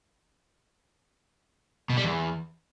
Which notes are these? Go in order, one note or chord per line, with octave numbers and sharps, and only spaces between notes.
B2
G3
E2